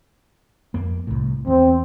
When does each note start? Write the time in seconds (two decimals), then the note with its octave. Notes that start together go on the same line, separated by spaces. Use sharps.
0.74 F2 A#3
1.07 C2 A2
1.47 E2 C4